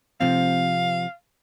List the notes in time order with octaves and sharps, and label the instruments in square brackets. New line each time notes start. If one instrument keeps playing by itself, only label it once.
[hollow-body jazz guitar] C3 F3 C4 [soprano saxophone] F5